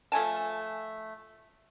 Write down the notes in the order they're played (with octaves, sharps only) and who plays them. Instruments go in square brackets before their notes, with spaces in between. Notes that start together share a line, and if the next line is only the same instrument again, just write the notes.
[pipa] F3 A3 G#5 A5